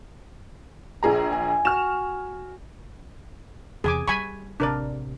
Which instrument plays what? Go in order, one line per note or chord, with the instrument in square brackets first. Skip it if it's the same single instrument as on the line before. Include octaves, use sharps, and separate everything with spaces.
[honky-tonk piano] A#1 G#4 A#5
[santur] G#5
[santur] F#4 [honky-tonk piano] F6 E7
[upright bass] E2 C3 [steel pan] G#4 G#5 D6
[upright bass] G3 [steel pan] G#5 B5 C#6
[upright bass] A1 C3 [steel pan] D4 A#4 D5